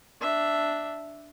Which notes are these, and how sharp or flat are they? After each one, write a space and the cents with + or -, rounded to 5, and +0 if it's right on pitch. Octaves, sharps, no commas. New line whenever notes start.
D4 +0 E5 +0